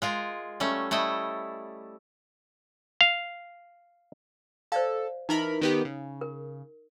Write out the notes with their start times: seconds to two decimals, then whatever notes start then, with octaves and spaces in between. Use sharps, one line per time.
0.02 G#3 F4 A#4
0.60 G3 A3 C#4
0.91 G3 A3 E4 D#5
3.01 F5
4.72 A4 C5 D5 F5
5.29 E3 D#4 A#4 D#5 B5
5.61 D#3 B3 G4
5.85 C#3
6.21 A#4